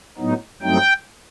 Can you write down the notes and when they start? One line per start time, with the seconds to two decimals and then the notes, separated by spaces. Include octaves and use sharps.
0.18 A2 F#3 B3 D#4
0.62 G2 F#3 A3 C4 D#4 G5